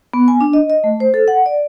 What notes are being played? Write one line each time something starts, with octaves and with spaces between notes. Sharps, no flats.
B3
G#5
D4
D#5
D#5
A3
C5
A4
F#5
D5